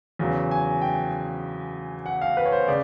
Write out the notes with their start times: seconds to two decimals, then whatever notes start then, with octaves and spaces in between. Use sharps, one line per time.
0.19 E2 C#3 F#3
0.51 G#5
0.82 G5
2.06 F#5
2.22 F5
2.37 B4
2.46 C#5
2.52 C5
2.68 C#3 D5